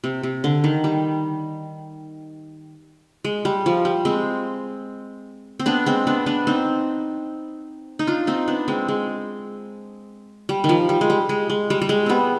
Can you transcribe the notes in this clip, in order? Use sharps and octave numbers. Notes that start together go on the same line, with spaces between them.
C3
C3
D3
D#3
G3
G#3
G3
F3
G3
G#3 C4
C4
B3 D4
G#3 C4
B3 D4
B3 D4
C4 D#4
D#4
D4 F4
C4 D#4
B3 D4
G#3 C4
G#3
G3
D#3
F3
G3
G#3
G3
G#3
G#3
G3
G3
G#3
G3 B3 C4